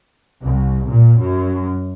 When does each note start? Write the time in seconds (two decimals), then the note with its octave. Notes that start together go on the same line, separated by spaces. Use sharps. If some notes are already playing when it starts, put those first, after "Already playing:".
0.42 C2
0.91 A#2
1.20 F#2